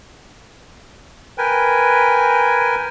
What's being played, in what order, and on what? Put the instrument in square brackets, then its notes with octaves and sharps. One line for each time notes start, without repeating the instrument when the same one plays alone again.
[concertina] A#4 B4 G5 G#5